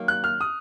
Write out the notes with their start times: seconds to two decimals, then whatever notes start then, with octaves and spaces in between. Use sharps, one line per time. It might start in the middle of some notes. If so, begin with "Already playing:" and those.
Already playing: D#3 F#3 A#3
0.08 F#6
0.24 F6
0.41 D#6